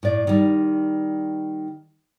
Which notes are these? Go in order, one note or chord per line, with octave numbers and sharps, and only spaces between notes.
A2 D5
D#3 G3